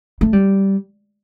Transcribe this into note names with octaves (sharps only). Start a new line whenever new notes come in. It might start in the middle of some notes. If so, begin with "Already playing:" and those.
A3
G3